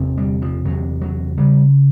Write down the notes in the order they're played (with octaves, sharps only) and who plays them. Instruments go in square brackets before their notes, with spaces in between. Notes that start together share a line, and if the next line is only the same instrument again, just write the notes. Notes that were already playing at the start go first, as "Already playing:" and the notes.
Already playing: [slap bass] E2 C3
G3
F3
E2 C3 F#3
F#3
C#3 G3